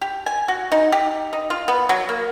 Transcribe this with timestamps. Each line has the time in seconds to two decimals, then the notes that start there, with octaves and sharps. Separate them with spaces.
0.01 G4
0.26 G#5
0.48 F#4
0.72 D#4
0.92 G4
1.33 D#4
1.50 F4
1.68 B3
1.89 F#3
2.09 A#3